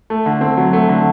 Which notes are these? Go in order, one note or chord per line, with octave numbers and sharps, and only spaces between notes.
A3
D3
C4
F#3
A3
D3